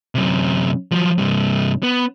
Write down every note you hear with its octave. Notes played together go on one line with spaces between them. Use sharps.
F#2 C3
F3 F#3
G2 C3
B3